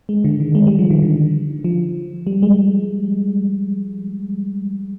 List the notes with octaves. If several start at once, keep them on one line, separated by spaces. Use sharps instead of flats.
G#3
D3
D#3
G#3
G3
F3
D#3
D3
F3
G3
G#3